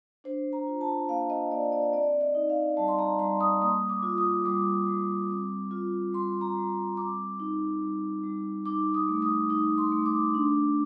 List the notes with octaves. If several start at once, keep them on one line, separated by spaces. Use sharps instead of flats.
D4 C5
A#5
F4
A5
A#3 F5
D#5
A#3 D5
D5
C4 D5
D#5
D#4
F5
G3 A5
C6
A#5
G3 C6
D#6
A#3 D#6
D6
F4
D#6
G3 D6
G3
C4
F4
G3 C6
A#5
G3
C4 D6
D#4
G3
G3
D#4 D6
D#6
A3
D#6
D#4 D#6
C6
A3
D6
D4